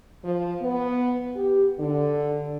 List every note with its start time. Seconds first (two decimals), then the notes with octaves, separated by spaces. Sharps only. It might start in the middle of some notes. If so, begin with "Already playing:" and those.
0.24 F3
0.62 B3
1.36 G4
1.80 D3